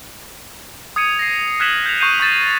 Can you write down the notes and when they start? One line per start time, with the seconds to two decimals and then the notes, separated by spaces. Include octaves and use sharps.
0.96 D#6 G#6 C#7 D#7
1.19 A#6 C7
1.60 F6 F#6 G#6 B6 E7 F#7
1.86 G6 F7
2.00 C#6 D#6 G6 C7 D#7
2.20 C#6 G6 A6 E7